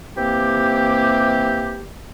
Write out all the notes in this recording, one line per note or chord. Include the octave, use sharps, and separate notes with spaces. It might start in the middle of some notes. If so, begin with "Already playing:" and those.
C3 E3 A#3 C4 G4